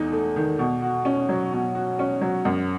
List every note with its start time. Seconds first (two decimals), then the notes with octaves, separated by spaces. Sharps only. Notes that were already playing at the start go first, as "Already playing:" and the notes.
Already playing: E2 A3 D#4
0.12 A3
0.36 D#3
0.59 B2
0.82 F#4
1.05 C#4
1.29 F#3
1.52 B2
1.75 F#4
1.99 C#4
2.21 F#3
2.45 F#2